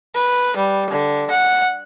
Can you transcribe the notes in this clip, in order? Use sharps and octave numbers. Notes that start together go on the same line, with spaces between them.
B4
G3
D3
F#5